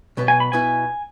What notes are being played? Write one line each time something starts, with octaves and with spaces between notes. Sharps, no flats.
B1 B2 B3
G#5
B5
B2 B3 E4 G#5